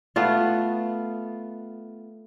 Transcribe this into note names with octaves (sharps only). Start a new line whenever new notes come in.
A3 B3 F4